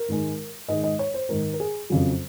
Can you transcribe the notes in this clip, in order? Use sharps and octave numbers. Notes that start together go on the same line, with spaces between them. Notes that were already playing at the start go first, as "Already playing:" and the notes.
Already playing: A#4
G#2 D#3 G#3
G#2 D#3 G#3 D#5
D#5
C#5
C5
G#2 D#3 G#3 A#4
A#4
G#4
F2 C#3 F#3 G#4